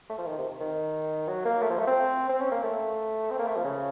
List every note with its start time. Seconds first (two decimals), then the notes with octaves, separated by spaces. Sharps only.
0.09 A3
0.18 F3
0.26 D#3
0.38 C3
0.60 D#3
1.28 F#3
1.45 A#3
1.62 A3
1.70 F3
1.79 A3
1.87 C4
2.29 C4
2.41 C#4
2.52 A#3
2.63 A3
3.31 C4
3.39 A#3
3.47 A3
3.56 F3
3.64 C#3